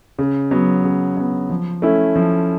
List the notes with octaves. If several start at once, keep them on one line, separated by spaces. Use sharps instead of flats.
C#3
F#3 B3
C#3
F#3 B3
F3
A3 C#4 E4
F3